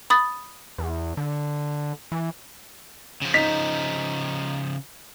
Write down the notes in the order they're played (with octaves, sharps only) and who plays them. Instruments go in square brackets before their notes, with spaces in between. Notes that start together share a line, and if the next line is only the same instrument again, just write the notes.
[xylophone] B5 D#6 A6
[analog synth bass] E2
D3
E3
[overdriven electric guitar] C#3 F3
[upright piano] D#4 B6 F7